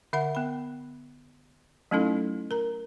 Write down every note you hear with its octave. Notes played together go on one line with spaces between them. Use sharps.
D3 E5 F#5 B5
B3 B5
F#3 A3 C#4 D#4 E4 A4
A#4 A#5